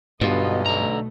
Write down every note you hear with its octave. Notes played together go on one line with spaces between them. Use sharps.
B1 G2 B2 D3 B3 F4 D#5
B2 D3 A3 A#5